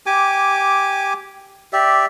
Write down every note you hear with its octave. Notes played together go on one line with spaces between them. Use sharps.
G4 G#5 D6
G4 D5 E5